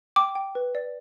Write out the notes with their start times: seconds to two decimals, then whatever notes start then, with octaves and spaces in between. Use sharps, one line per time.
0.16 G5 D6
0.35 G5
0.55 B4
0.75 D5